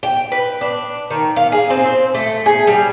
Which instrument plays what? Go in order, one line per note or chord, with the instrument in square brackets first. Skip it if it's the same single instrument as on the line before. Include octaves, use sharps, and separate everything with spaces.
[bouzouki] G5
B4
D4
D#3
F5
G#4
C4
C5
A3
G#4
G3